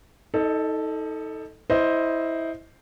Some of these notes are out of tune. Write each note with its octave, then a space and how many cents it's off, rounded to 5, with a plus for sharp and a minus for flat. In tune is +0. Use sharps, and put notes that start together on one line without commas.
D#4 +30 A4 +0 D#5 -30
E4 -15 C5 +0 D#5 +0